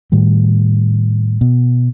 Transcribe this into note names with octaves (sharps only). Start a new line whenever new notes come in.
A2 D#3 G3
B2